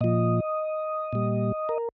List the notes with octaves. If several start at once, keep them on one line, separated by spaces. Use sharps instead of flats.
A#2 F3 D#5
A#2 G3
A#4